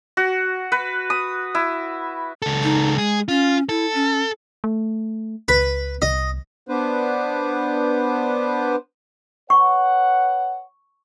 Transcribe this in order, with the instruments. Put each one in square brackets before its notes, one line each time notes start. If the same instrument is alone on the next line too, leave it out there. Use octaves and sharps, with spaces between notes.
[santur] F#4
B4
D#6
E4
[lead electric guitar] C#2 A4
[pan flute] D#4
[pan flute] G#3 [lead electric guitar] G#4
[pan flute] C#4 [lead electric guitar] F4
[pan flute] E4 [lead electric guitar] A4
[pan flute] C#4
[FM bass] A3
[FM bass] C#2 [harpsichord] B4
[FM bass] C2 [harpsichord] D#5
[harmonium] B3 D4 B4 C5
[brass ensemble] B4 C#5 F#5 [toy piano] C#6